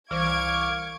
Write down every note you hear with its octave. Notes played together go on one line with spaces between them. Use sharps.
C2 E3 C5 F5 C#6 D6 G#6 D7